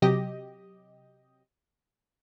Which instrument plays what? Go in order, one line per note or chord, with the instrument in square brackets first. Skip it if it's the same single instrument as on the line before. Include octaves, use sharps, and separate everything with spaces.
[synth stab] C3 F#3 G4 D#5